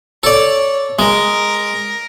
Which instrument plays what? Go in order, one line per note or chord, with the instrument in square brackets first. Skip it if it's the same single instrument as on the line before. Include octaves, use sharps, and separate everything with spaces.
[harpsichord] A4 D5 [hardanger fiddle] C#5
[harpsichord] G#3 [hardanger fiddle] A#4